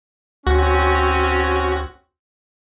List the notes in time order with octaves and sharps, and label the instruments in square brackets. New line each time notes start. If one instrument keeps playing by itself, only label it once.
[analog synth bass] D2 [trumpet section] C4 C#4 [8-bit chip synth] F#4